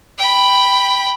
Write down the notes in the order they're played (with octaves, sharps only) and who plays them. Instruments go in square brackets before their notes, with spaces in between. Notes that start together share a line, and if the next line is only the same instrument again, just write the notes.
[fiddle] G5 B5